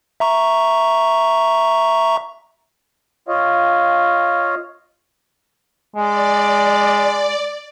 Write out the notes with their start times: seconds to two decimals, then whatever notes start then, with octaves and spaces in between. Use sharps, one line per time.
0.20 E5 A#5 C#6
3.28 F4 C#5 D#5 F5
5.96 G#3 D5